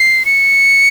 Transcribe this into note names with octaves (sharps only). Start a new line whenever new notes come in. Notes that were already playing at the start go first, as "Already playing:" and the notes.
Already playing: C7
C#7